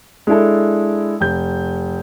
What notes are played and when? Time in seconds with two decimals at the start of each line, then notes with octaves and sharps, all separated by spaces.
0.27 G#3 D4 E4 A4
1.20 F1 G6